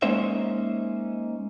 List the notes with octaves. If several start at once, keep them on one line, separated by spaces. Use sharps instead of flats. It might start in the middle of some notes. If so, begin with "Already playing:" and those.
G#3 A#3 C#4 D#4 C5 E5